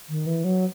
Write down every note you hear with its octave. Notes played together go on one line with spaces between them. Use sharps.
D#3
E3
F#3